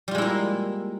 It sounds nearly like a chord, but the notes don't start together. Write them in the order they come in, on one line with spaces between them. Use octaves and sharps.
G3 F4 G#3 E4 A#3